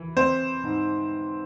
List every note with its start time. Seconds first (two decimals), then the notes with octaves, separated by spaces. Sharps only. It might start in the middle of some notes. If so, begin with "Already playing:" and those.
Already playing: E3
0.16 C4 C5
0.63 G#2